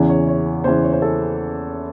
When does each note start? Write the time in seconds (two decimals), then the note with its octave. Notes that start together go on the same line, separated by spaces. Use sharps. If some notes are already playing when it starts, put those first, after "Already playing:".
Already playing: E2 C#3 E3
0.09 C#5
0.28 C#5
0.64 E2 C#3 E3 C5
0.83 C#5
0.93 C5
1.02 A4